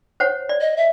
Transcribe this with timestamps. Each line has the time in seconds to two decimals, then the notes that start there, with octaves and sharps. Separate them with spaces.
0.20 C5 C#5 F#5
0.49 D5
0.61 D#5
0.77 E5